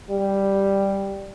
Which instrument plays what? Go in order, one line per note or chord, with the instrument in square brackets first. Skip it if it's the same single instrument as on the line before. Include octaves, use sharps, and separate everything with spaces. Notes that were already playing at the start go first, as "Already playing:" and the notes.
[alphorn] G3